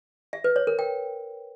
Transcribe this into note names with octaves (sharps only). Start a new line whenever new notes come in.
E5
B4
C#5
A#4
G5